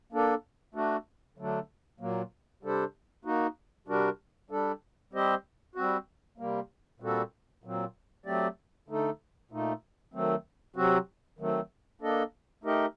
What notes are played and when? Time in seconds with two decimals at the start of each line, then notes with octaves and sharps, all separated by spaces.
0.12 A#3 D4 A4
0.74 A3 D4 F#4
1.38 D3 F#3 A3 D4
2.00 A#2 F#3 A#3
2.63 C3 G3 D4 A4 C5
3.25 A#3 D#4 F#4
3.87 C3 G3 D4 F#4 A#4
4.50 G3 D4 A4
5.13 G3 C4 G4 C5 D#5
5.75 G3 C4 F#4
6.38 C3 G3 A#3
7.00 A#2 G3 C4 F#4 A4
7.63 A#2 F#3 C4
8.26 F#3 A3 C4 G4 D5
8.88 D3 A3 D#4 A4
9.51 A#2 A3 D#4
10.13 D#3 F#3 A3 C4
10.76 C3 F#3 C4 F#4
11.39 D#3 F#3 A3 C4
12.01 A#3 D4 A4 D#5
12.64 A3 D#4 G4 A#4 D#5